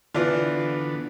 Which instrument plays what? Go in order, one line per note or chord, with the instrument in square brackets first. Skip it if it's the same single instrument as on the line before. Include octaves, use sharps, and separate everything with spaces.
[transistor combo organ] D3 B3 [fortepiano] E3 D4 F4